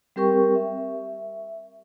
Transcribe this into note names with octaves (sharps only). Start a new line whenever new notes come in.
G3 C4 G4 A#4 G5 C#6
E5